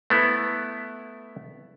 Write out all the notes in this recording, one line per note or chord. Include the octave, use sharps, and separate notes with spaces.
A3 B3 E4